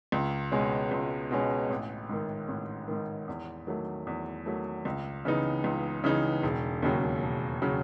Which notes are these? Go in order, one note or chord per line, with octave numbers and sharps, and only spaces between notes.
C#2
B2 G#3 C#4
C#2
B2 G#3 C#4
A1
G#2 D#3
A1
G#2 D#3
E2
D#3 F#3 A3
E2
D#3 F#3 A3
C#2
C#3 E3 B3 D#4
C#2
C#3 E3 B3 D#4
E1
D#2 C#3 F#3
E1
C#3 F#3